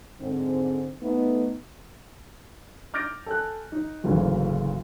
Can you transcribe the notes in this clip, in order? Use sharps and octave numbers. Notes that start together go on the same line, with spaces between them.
G#2 D3 C4
A3 B3 D#4
D6 F6 G6 A6 A#6 D7
A4 G#5 F#6
D#4
F#1 D2 G#2 C#3 E3 F#3